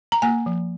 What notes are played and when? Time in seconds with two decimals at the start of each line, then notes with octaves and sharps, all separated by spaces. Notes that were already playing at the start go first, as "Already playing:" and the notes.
0.12 A#5
0.22 A#3 G#5
0.46 F3